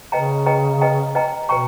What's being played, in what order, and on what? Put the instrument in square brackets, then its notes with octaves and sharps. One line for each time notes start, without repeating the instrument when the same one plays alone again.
[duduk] C#3 [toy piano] B4 D#5 G5 A#5
[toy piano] B4 D#5 G5 A#5
B4 D#5 G5 A#5
B4 D#5 G5 A#5
[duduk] B2 [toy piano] B4 G5 A#5 C#6